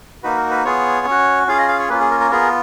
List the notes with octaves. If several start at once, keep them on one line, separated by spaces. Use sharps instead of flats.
A#3 D#4 F#4 B4
A#4
B4
B3 F4 G#4 C#5
C#4 F#4
C#4 F4 G#4 F5
D#5
F5
C#5
A#3 C#4 F4 B4
G#4
A#4
A#4
B3 F4 G#4 A#4